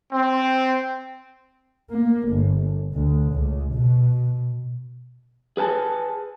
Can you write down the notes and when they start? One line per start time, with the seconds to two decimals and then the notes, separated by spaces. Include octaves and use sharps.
0.13 C4
1.90 A#3
2.29 G1
2.94 D2
3.34 C#2
3.74 B2
5.57 G#4 B4 G#5 A5